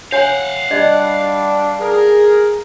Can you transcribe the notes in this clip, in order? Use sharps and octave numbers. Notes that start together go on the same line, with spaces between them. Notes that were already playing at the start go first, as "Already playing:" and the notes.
C#5 F5 F#5 G#5
G3 D4 D5 D#5
G#4 A#4